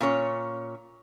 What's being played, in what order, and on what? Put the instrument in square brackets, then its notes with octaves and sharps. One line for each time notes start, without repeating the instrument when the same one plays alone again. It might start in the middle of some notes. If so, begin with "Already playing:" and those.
[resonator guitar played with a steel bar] A#2 C#4 C#5